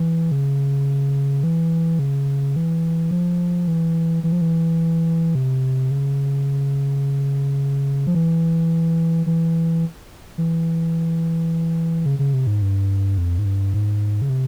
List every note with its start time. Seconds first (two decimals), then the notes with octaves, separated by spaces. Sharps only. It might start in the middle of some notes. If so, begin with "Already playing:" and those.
Already playing: E3
0.32 C#3
1.44 E3
1.99 C#3
2.56 E3
3.11 F3
3.68 E3
4.24 E3
4.32 F3
4.41 E3
5.35 C3
5.91 C#3
8.07 F3
8.15 E3
9.26 E3
10.38 E3
12.06 C#3
12.19 C#3
12.34 C3
12.47 G#2
12.62 G2
13.18 F2
13.39 G#2
13.45 G2
13.74 G#2
14.22 C#3
14.29 C3